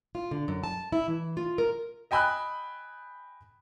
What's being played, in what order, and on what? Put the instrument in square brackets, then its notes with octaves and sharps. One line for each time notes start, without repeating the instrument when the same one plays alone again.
[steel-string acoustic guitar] F4
D3
F#2
A5
E4
E3
F4
A#4
[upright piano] D#5 G5 G#5 B5 E6 F#6